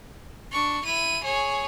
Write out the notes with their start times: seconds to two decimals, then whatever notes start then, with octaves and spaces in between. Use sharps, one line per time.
0.52 D4 C#6
0.85 E4 D#7
1.24 G#4 C#5